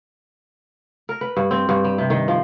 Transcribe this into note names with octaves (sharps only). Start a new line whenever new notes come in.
A#4
B4
G2
C4
G2
G3
C3
D#3
F3